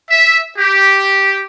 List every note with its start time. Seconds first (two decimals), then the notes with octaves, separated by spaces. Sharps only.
0.11 E5
0.58 G4